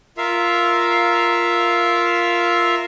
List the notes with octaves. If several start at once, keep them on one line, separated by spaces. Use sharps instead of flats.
F4 A#4 E5 F5